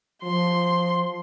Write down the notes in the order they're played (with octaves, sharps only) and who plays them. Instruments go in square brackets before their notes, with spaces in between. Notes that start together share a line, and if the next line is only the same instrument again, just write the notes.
[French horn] F3 [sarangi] C6